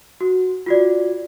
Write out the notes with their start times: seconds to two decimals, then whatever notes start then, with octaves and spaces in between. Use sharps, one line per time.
0.21 F#4
0.66 F4 F#4 D5